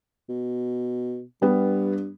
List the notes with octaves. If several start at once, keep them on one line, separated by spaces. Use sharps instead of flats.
B2
G2 G3 B3